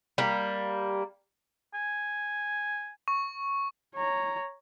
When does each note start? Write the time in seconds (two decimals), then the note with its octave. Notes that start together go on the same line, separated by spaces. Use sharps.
0.18 G3 A#3
1.74 G#5
3.08 C#6
3.95 C#5 A#5